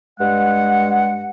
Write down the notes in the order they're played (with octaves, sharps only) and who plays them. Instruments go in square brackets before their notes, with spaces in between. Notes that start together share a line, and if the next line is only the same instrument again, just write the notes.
[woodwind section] G2 G#3 F#5